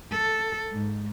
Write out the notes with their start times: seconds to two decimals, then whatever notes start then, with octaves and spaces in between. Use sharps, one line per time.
0.11 A4
0.72 G#2 G#3